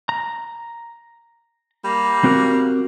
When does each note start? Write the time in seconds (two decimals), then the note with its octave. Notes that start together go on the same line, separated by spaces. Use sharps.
0.09 A#5
1.84 G3 A#3
2.24 C4 F#4 A#4